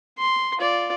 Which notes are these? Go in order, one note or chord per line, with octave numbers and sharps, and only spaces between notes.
C6
F4 D5